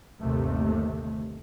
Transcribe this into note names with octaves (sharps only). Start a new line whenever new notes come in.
G1 D#2 C3 A3